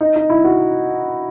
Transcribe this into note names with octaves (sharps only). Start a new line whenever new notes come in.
D#4
D#4
E4
F#4